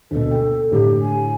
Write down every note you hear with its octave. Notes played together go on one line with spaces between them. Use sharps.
D2 B2 A4
G5
A2 D3 G4
G#5